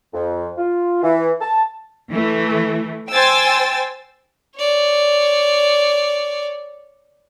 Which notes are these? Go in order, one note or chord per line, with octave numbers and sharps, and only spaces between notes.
F2
F4
E3
A5
E3 A3
C5 G5 G#5 E6 A6
C#5 D5